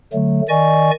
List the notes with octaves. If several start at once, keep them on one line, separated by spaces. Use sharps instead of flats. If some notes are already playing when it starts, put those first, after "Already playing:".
D3 F#3 A3
D#3 D5 D#5 G#5 C#6